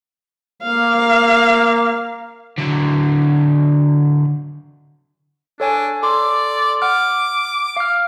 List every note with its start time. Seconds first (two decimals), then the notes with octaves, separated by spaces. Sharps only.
0.63 A#3 F5
2.58 D3 F#3
5.60 D4 A4 C#5 G#5
6.03 A4 D5 C6 D6
6.82 F#5 D6 F6
7.77 F5 F6